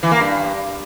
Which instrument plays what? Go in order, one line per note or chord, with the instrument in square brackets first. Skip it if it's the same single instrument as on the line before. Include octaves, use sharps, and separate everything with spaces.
[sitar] E3
A#3
G2